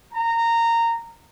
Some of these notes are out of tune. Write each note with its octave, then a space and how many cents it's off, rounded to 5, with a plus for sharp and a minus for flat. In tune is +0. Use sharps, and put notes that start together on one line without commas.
A#5 -15